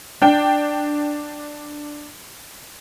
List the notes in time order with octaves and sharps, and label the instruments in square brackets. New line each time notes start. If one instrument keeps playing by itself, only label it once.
[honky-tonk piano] D4 G5